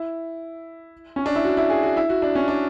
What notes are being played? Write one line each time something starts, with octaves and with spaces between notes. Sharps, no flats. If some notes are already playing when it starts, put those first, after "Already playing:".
Already playing: E4
C#4
D4
E4
F#4
E4
G#4
F#4
E4
F#4
D4
C#4
D4